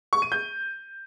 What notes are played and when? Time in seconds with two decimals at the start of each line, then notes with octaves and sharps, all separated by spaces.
0.13 C#6
0.22 D#7
0.32 G6